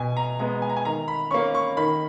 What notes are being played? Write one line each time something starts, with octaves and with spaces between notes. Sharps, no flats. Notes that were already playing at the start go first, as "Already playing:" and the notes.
Already playing: B2 G#5
A#5
G#3 B3 A#5
G#5
A#5
G#5
D#3 A#5
B5
A#3 C#4 C#6
C#6
D#3 B5